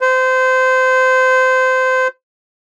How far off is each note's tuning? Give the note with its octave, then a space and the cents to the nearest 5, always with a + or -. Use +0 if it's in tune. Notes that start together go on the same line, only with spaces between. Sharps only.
C5 -25